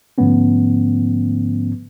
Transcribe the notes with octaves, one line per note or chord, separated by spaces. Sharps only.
G#2 D3 F3 A3 B3 C#4